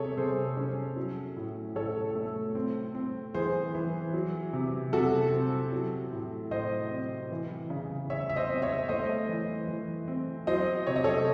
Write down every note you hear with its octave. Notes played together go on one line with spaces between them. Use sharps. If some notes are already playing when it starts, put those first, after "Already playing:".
Already playing: C3 G#4 A4 C#5
C3 G#4 C5
C#4
F#3
A2
A2 A4 C#5
A3
C4
C4
E3 G#4 C5
E3
F#3
C3
C3 F#4 A4
C4
F#3
A2
A2 C5 D#5
C4
E3
C#3
C#3 C#5 E5
E5
C5 D#5
C4
C#5 E5
A3 C5 D#5
E3
E3
C4
F#3 C5 D#5
C3 C#5
D#5
A4 C#5